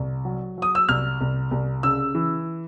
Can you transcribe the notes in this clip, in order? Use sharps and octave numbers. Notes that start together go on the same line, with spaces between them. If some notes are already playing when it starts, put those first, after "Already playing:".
Already playing: C2
F#3
F#3 D#6
E6
C2 F6
C2
C2
C#3 E6
E3